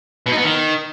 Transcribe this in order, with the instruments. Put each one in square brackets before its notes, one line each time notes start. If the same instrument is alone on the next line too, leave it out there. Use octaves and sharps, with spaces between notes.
[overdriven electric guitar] B2
D#4
B3
D#3